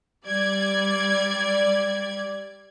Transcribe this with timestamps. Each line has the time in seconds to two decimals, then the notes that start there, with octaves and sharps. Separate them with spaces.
0.25 G3 D5 G#6